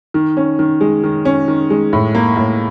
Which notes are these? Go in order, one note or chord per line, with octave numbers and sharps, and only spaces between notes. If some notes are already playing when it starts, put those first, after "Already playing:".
D#3
C#4
D#3
G#3
D#3
C#4
D#3
G#3
A2
A#3
A2